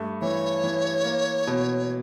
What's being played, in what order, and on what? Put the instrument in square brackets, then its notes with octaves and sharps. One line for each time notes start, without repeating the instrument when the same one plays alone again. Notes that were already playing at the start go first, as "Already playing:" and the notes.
Already playing: [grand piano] G2 A3
[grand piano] E3 [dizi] C#5
[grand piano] E3
A#3
B2